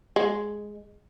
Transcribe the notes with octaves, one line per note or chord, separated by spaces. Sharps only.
G#3